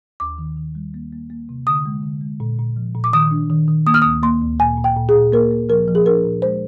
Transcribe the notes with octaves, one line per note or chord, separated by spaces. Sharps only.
D#2 D6
D#3
D#3
G3
A#3
A#3
A#3
C3
D3 D#6
G#3
D3
G#3
A#2
A#2
F3
A#2
D6
D#3 D#6
D4
D#3
D#3
A#3 D#6
F6
D2 D#6
A#3 C6
D2
A#2 G#5
A#2
G5
A#2
G#4
A#2
A#3 A#4
A#3
F3 A#4
F3
G#4
D4 A#4
A#2
G#3 C5